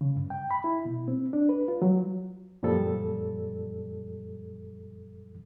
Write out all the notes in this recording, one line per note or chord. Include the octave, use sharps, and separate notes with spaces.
C#3
G2
G5
B5
E4
B2
C4
D4
B4
F4
F#3
F#2 A#2 F3 G3 A4